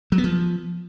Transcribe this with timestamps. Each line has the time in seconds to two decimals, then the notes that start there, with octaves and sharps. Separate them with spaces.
0.12 F#3
0.18 B3
0.24 F3